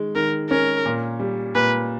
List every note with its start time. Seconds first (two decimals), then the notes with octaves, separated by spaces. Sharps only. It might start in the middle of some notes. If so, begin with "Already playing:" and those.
Already playing: D#3 G#3
0.15 D#3 A#4
0.50 C#4 A#4
0.85 A#2
1.20 G3
1.55 A#2 B4